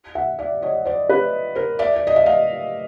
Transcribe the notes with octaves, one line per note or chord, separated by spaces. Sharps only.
E5 F#5
D5 E5
C#5 D#5
C5 D5
B4 C#5
A#4 C5
D5 E5
D5
D#5
E5
D#5 F5